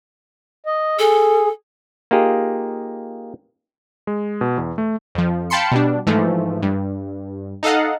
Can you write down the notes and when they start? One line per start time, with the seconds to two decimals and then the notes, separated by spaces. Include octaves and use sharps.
0.66 D#5
0.99 G#4 A4
2.11 A#3 D#4 F4 G4 G#4
4.07 G#3
4.41 B2
4.58 E2
4.78 A3
5.15 F2 F3
5.50 F5 G5 A5 B5 C6 C#7
5.72 B2 G3 D4
6.07 G#2 E3 F3 A3
6.63 G2
7.63 D#4 A4 D#5 F5 F#5